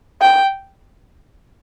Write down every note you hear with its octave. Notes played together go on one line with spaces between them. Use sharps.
G5